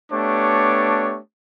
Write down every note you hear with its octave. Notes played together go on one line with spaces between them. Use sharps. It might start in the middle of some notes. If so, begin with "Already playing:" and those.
A3 B3 D4 G4 C#5 D6